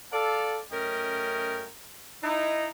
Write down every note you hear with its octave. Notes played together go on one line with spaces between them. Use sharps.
A4 D5 F5
F#2 A3 C#4 A#4 D#5 G5
D#4 E4